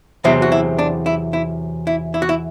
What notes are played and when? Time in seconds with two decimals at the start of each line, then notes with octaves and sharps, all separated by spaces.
0.24 E2 C3 F#3 C4 E4
0.42 F#4
0.52 E4
0.78 D4
1.06 E4
1.33 E4
1.87 E4
2.14 E4
2.22 F#4
2.29 E4